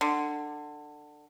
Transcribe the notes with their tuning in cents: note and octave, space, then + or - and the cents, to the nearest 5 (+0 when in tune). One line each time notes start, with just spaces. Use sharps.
D3 +20